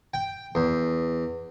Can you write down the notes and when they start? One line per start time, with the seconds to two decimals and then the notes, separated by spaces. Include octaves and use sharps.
0.14 G5
0.55 E2